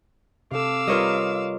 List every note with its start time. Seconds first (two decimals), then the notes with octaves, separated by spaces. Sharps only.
0.52 C3 A4 F5 D6 E6
0.88 G3 F4 A#4 B4 C#5 D#5